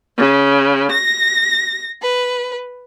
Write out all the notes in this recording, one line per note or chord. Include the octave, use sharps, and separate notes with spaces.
C#3
A#6
B4